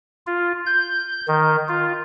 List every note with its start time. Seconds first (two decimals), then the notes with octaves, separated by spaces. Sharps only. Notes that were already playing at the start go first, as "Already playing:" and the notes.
0.27 F4
0.66 G6
1.28 D#3
1.69 F4